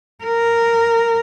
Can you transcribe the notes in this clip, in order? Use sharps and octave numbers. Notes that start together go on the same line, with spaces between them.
A#4